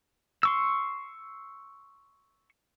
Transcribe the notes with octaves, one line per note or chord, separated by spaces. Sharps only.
C6 C#6 E6